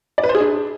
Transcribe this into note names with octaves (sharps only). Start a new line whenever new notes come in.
D5
B4
C5
G#4
D4